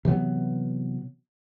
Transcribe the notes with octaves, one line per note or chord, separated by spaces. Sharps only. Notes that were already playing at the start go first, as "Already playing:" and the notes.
C3 E3 F#3 B3